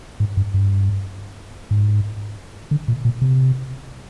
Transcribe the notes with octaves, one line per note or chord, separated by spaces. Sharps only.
G#2
G2
G2
G#2
D3
A#2
A#2
C3